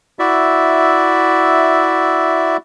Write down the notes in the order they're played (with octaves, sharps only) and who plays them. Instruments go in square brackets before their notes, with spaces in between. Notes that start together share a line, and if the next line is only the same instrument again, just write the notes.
[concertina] E4 F#4 D5 E5